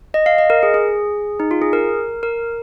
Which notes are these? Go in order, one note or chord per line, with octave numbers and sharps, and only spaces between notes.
D#5
F5
D#5
A#4
G#4
G#4
D#4
F4
G#4
A#4
A#4